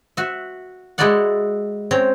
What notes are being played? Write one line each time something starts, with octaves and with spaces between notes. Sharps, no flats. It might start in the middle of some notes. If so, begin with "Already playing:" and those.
F#4 E5
G#3 E4 F#4 A4 D5 F#5
C4 C#4 A#5